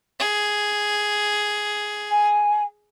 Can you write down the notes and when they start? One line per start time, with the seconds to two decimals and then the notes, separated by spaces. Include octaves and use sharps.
0.20 G#4
2.10 G#5